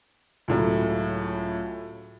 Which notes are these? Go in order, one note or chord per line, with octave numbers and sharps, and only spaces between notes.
C#2 A2 F#3